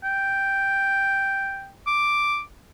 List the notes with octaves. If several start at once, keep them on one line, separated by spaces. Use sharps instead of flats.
G5
D6